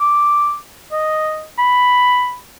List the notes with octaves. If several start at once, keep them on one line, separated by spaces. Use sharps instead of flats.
D6
D#5
B5